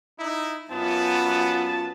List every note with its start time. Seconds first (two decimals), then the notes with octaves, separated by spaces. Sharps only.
0.20 D#4 E4
0.72 F#2 B3 F4 A5